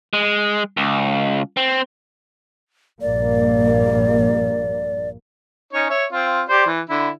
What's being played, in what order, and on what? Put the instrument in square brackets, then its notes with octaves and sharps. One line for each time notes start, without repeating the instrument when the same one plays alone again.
[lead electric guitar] G#3
C#2
C4
[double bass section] A#1 G2 A#3 [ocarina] D5
[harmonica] C#4 D#4 C#5
C#5 E5
C4 F4
G4 C5 D5
E3
D3 E4